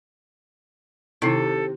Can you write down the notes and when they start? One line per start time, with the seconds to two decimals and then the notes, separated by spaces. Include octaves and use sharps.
1.22 C3 D#3 D#4 E4 A4